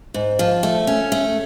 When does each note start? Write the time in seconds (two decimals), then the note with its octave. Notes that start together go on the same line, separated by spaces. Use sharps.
0.14 G#2
0.39 F3
0.63 A3
0.87 C#4
1.12 A3